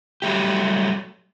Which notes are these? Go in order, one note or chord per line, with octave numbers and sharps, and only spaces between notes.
F#3 G3 A3 G4